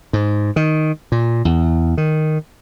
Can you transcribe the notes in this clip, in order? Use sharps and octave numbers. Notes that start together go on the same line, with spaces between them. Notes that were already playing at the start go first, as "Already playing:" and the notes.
G#2
D#3
A#2
E2
D#3